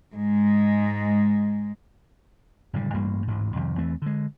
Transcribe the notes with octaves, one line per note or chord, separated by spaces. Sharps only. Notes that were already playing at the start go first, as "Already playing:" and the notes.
G#2 G#3
F#1 A2 D3 G3
A1 G2 G3 A#3
A1 D2 G#2
C2 F2 D#3
E2 E3 A3 C4
D3 G#3